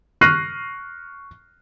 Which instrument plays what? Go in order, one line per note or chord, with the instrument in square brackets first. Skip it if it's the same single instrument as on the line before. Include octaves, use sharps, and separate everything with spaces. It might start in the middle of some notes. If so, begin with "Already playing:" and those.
[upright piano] C#6 F6 F#6 A#6 C7 D#7